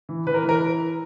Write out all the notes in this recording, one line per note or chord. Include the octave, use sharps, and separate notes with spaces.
E3
E3 B4
A#4
E3
A#4